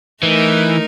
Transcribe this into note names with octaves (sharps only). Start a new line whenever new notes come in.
E3 A3 D#4 A#4